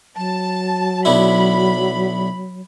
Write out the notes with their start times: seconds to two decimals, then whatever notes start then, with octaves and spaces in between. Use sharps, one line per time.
0.17 F#3 A5
1.05 B1 D4 E4 B5